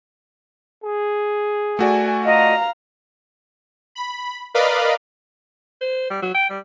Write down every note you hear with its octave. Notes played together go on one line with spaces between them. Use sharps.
G#4
A3 F#4 D5 G#5
F4 D#5 F5 A#5
B5
A#4 B4 D5 D#5 F5 B5
C5
G3
F#3
G5
G3